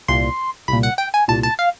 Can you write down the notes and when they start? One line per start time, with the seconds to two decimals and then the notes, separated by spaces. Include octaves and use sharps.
0.08 C2 A#2 C6
0.68 C2 A#2 B5
0.83 F#5
0.98 G5
1.14 G#5
1.28 C2 A#2 A5
1.43 A5
1.59 F5